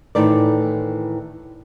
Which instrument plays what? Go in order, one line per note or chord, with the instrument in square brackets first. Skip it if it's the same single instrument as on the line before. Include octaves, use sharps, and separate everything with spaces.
[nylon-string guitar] A2 D#3 E3 A3 C5 D5